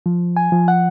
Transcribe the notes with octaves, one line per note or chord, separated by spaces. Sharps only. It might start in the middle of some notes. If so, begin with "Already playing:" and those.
F3
G#5
F3
F#5